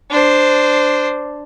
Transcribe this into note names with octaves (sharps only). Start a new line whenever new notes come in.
D4 C5